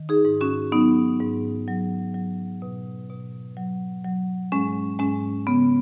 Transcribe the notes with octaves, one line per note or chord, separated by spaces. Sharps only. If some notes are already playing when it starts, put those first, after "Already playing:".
Already playing: D#3
D#4 G#4
G#2
C#4 F#4
F#3 B3 D#4
G#2
F#3
F#3
B2
B2
F#3
F#3
G#2 G#3 C#4
G#2 G#3 C#4
C#3 B3